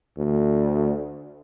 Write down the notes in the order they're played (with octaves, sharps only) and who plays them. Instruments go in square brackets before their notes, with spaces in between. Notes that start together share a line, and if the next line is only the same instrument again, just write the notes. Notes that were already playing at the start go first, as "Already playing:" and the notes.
[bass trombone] D2